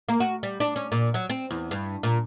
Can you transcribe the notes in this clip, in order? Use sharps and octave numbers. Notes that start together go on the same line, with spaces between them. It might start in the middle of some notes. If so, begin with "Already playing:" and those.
A#3
F#4
G3
D4
C#4
A#2
F#3
C4
E2
G2
A#2